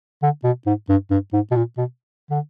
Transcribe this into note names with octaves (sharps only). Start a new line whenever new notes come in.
D3
B2
G#2
G2
G2
G#2
B2
A#2
B2
D3